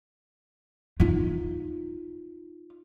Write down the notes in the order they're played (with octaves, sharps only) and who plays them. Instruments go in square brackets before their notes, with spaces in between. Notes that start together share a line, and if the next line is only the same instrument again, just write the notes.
[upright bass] D#4 F4